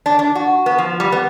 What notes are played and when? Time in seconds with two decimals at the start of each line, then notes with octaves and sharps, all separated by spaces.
0.06 D4
0.19 D4
0.35 F#4
0.66 B3
0.78 F3
1.00 G3
1.12 B3